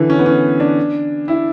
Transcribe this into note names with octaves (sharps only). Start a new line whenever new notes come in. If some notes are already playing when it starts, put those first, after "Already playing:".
Already playing: D3 E3
C#4
B3
C#4
D4
E4